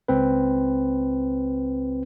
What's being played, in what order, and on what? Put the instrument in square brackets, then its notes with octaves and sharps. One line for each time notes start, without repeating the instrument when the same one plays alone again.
[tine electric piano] C#2 C4 B4